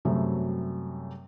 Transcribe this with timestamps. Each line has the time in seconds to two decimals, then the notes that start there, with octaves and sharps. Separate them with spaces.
0.05 F#2 C3 F#3 G3 A3